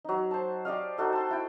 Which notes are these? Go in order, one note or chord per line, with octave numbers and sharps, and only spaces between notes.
F#3 D#4
C5 A5
G4 D5 D#5 F5
D#4 F#4 A4 D#5
A5 C6
E4 G5